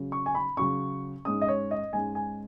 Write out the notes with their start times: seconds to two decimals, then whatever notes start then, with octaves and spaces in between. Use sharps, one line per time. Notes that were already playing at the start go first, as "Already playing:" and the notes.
Already playing: C#3 F#3 C#4
0.12 C#6
0.26 G#5
0.35 B5
0.57 C#3 F#3 C#4 C#6
1.25 G#2 G#3 C#4 D#6
1.42 D#5
1.48 C#5
1.71 D#5
1.93 G#2 G#3 C#4 G#5
2.15 G#5